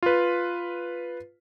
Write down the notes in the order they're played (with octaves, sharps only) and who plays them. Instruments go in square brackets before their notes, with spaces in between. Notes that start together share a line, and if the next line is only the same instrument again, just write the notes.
[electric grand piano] F4 B4